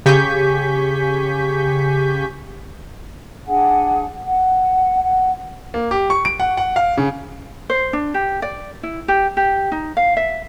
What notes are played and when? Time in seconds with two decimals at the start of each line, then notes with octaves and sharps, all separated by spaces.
0.06 C#3 G4 G#5 C#6 G6 B6
3.45 D4 G#4 F#5 G#5
4.24 F#5
5.01 F#5
5.74 A#3
5.91 G4
6.10 C#6
6.25 D7
6.40 F#5
6.57 F#5
6.76 F5
6.97 C#3
7.70 C5
7.93 D4
8.14 G4
8.42 D5
8.83 E4
9.08 G4
9.37 G4
9.72 D#4
9.97 F5
10.17 E5